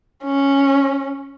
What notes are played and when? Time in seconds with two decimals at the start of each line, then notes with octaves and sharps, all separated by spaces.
0.24 C#4